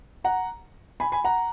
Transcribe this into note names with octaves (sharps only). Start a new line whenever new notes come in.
F#5 A#5
G#5 B5
G#5 B5
F#5 A#5